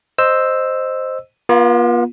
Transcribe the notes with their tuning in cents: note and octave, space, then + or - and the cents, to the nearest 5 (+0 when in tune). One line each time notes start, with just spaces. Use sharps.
C5 +0 D#5 -10 E6 +0
B3 -45 F4 +5